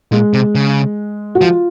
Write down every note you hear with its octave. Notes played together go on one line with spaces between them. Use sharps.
A#2 G#3
C3
C#3
F#4
F3 F4